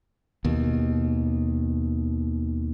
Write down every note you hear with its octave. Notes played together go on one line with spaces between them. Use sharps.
D#2 B2